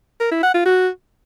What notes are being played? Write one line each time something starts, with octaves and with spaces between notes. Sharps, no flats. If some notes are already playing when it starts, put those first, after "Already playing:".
A#4
E4
F#5
F4
F#4